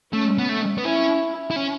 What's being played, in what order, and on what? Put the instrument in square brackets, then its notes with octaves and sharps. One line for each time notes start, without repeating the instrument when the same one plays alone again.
[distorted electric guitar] A3 [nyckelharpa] C#4
[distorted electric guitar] B3
A3
B3
[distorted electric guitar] C#4 [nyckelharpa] E4
[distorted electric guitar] E4
C#4